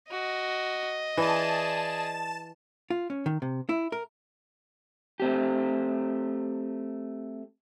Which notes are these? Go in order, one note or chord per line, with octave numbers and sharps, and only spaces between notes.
F#4 D#5
E3 G#4 D5 A5 E7
F4
C#4
D#3
C3
E4
A#4
A3 C4 G4